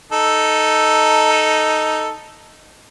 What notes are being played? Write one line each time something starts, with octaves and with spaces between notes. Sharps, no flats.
D#4 A4